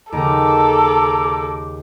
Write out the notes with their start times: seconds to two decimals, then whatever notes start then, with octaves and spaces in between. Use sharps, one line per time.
0.12 D#2 C#3 A4 A#4 A#5 D6